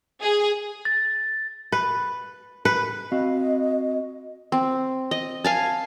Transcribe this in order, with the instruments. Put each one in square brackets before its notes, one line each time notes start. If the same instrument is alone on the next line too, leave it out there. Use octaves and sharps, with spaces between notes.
[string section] G#4
[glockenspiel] A6
[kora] B4
B4
[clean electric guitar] C4 F#4 F5 [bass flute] D#5
[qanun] C4
D#5
F5 G#5 A5